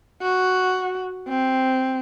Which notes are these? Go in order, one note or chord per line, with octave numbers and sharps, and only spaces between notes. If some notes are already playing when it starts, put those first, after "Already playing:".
F#4
C4